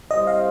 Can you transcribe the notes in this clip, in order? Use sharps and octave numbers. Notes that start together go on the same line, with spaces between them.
G3 C4 E4 G4 C5 D#5
F5